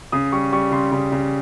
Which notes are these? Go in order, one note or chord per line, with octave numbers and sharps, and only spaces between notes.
C#3 D#6
G3 C#6
G3 C#6
C#3 C6
C#3
C#3